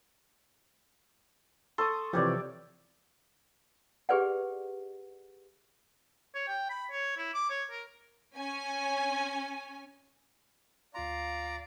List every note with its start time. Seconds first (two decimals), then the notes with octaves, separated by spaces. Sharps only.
1.78 A4 C6 C#6 D#6
2.13 C3 E3 F3 G4 C#5 D5
4.09 G4 G#4 B4 D5 F#5
6.35 C#5
6.48 G5
6.70 B5
6.92 C#5
7.17 E4
7.34 D6
7.50 C#5
7.71 A#4
8.36 C#4 G#5
10.94 D2 F4 D5 F5 A#5 C6